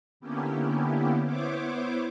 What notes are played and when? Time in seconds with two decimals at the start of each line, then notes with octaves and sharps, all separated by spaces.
0.20 D3 A#3 B3 C#4 E4 G4
1.25 B3 E4 C5 C#5 D6